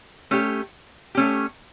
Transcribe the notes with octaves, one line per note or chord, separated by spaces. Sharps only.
A3 C#4 G4
A3 C#4 G4